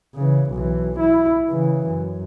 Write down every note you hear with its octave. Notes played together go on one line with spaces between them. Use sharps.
C#3 E3
B1 E3
E4
C#3 E3
F#2